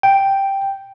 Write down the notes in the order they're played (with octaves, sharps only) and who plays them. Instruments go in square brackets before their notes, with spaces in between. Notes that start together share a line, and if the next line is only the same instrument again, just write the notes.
[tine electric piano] G5